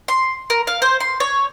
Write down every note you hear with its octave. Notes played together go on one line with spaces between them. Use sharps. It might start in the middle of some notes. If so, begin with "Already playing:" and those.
C6
A#4
F5
C5
C6
C#5